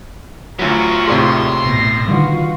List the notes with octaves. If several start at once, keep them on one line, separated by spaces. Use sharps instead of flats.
D2 F#3 B3 E4 F4 A#5 C#6
D#2 A2 C3 G#4 D5 C6
A1 B2 A#6
D3 D#3 G3 F4 F#4 B4